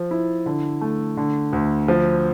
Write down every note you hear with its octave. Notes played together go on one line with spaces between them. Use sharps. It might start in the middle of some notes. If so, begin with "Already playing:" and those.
Already playing: F3
E4
D3
A3
D3
D2
F3